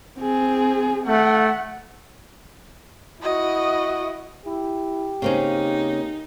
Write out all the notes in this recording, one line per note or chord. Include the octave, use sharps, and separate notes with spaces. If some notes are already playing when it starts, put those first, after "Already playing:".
C4 G#4
A3 F#5
E4 F#4 D#5
E4 G4
C#3 A#3 C4 C#4 D#4